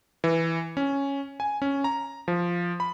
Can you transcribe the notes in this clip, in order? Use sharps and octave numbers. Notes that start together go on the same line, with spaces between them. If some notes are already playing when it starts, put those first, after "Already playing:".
E3
C#4
G#5
C#4
A#5
F3
B5